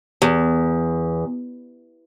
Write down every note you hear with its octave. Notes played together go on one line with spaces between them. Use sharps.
E2